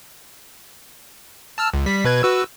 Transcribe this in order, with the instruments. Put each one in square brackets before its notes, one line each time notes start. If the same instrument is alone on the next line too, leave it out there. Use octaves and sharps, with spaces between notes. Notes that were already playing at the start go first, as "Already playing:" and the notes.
[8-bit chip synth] A5 E6 F6
C#2
G3 B6
B2 B4 G#6
F#4 B4 E6